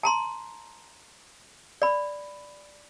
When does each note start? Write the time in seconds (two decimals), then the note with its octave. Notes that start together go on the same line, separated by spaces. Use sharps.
0.03 A5 A#5 C6
1.82 D5 B5